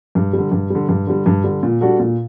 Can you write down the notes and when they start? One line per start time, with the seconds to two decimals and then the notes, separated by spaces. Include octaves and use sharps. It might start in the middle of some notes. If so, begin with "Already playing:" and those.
0.15 G2
0.33 D3 G3
0.52 G2
0.70 D3 G3
0.89 G2
1.07 D3 G3
1.26 G2
1.44 D3 G3
1.63 A#2
1.81 G3 D4 F#4 A4
2.00 A#2